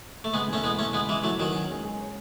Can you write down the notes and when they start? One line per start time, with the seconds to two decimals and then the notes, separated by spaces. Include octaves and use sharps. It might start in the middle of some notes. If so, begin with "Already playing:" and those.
0.24 A3
0.34 C#3 G#3 B3
0.48 E2
0.53 A3 C#4
0.64 E3 G#3 B3
0.78 E2 A3 C#4
0.93 C#3 G#3 B3
1.09 E2 E3 G#3
1.24 E3 F#3 A3
1.39 E2 D#3 F#3
1.54 C#4
1.70 G#3
1.84 G#4
2.00 C#5